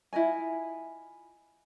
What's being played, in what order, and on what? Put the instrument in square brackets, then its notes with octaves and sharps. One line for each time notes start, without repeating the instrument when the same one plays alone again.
[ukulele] E4 F4 D#5 G#5